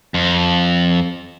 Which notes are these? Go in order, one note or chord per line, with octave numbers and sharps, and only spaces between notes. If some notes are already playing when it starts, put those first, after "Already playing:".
F2